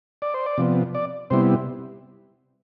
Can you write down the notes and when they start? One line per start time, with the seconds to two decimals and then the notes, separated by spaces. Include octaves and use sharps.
0.22 D5
0.34 C5
0.46 D5
0.58 C3 F3 B3
0.95 D5
1.30 C3 G3 B3 E4 C5